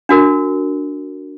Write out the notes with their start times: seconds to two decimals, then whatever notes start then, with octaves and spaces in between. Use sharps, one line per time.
0.09 D4 F#4 A#4